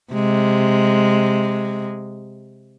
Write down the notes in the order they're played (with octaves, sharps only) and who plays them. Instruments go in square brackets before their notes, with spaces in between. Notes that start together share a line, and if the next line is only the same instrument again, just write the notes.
[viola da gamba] C3 G#3